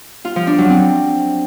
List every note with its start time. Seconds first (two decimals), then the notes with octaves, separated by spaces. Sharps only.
0.25 F4
0.36 F3
0.47 D4
0.58 F#3
0.70 C4